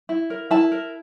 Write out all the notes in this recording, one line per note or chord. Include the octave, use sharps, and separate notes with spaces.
E4
A#4
E4 A5
A#4